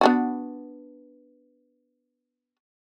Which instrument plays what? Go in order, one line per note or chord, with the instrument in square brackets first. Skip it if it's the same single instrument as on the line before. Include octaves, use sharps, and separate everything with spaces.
[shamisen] B3 D4 F#4